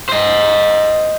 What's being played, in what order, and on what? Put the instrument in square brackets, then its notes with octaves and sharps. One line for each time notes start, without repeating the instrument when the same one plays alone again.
[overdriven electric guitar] C5 D#5